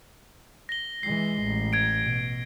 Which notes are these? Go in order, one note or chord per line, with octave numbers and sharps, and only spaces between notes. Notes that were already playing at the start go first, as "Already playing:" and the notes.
A#6 G7
E3 G#3 C7
A1
G#6 D7
B2